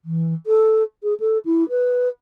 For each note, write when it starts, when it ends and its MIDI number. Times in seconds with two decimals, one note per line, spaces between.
0.05 0.33 52
0.46 0.83 69
1.03 1.14 68
1.20 1.38 69
1.45 1.67 64
1.69 2.08 71